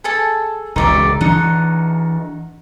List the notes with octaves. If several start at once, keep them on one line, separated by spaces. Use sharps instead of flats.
G#4 A4 A5
E1 C#2 D#4 D5 E5
E3 D4 D#4 F#5